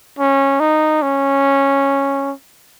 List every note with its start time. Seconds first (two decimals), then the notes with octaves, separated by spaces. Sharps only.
0.19 C#4
0.60 D#4
1.02 C#4